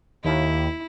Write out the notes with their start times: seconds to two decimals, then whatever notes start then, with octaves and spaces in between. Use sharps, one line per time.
0.24 D#2 E4